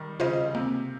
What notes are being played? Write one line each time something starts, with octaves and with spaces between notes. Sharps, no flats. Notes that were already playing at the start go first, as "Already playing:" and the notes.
Already playing: D#3 G3
C#3 F4 C5 D#5
C3 A#3